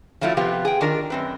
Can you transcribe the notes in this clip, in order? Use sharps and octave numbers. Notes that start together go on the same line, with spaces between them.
F3 F#3 A3 E4 F4
C3 F3 B3 F4 G4
G#4 G5
D#3 D4 F4 A#4
F#2 C4 B4